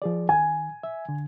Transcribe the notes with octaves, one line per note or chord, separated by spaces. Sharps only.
F3 G#4 D5
D#3 G#5
E5
D3